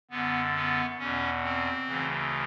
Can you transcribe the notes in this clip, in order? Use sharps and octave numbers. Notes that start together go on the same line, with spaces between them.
F#2 D3 B3
B3
E2 B2 C#4
C4
D2 C#3 E3